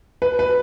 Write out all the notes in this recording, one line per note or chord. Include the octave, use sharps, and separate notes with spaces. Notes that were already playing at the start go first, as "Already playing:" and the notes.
B4
B4